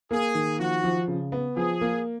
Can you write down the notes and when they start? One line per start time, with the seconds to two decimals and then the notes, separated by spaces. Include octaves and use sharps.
0.11 A#3 G#4
0.35 D#3
0.59 F3 F#4
0.84 F3
1.08 C#3
1.32 B3
1.56 F3 G#4
1.81 A#3